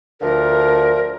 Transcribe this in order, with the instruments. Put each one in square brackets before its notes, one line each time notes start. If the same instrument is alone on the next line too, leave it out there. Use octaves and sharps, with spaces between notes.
[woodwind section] D2 D3 F3 A#4